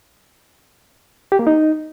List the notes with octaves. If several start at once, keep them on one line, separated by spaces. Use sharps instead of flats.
G4
A#3
D#4